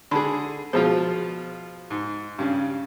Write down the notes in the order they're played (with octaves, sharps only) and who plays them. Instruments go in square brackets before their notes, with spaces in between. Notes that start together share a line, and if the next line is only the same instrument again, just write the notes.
[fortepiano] D3 G#4 [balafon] B5 C6
[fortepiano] B2 F3 F4 [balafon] F#4 G#4 C5
[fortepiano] G#2
G2 C#3